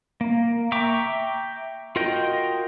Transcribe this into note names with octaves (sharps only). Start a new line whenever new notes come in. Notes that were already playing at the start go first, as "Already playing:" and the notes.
A#3
E5 G5 A#5 C#6 D6
F4 F#4 A#4 D#5 G5